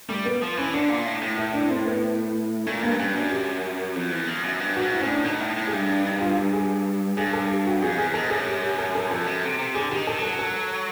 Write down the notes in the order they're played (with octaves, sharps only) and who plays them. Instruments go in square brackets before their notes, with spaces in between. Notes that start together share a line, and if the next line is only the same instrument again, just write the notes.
[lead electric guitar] G3 [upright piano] A3
[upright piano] B3
[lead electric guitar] F3
[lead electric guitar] E3 [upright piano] C#4
[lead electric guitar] D3 [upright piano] D4
[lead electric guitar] A#2
A2
A2
[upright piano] E4
D4
C4
B3
[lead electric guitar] A#2 [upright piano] A3
[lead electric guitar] G2 [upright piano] A#3
[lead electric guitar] G2 [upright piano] C#4
[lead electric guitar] F#2 [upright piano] D4
[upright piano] G4
[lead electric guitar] F2
E2
F2
F#2
G2
[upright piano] F#4
[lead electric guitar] G#2
[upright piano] E4
[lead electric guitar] A2 [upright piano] C#4
[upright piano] D4
[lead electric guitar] B2 [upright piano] D#4
[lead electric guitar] A2
A2
[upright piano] G#4
[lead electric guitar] G2
[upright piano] D4
D#4
F4
G4
G#4
[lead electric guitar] G2 [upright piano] G#4
[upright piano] A4
G4
F#4
[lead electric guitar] F2 [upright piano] G#4
[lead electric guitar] E2 [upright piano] G#4
[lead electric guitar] G#2 [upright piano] A4
[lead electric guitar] F#2 [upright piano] G#4
[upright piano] G4
G4
A4
A4
[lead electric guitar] F2 [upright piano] A4
[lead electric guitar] F#2
C3
C3
[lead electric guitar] D3 [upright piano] G#4
[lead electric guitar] D3 [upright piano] G4
[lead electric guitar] D#3
[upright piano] A4
[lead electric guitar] F#3 [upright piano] A4
[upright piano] A4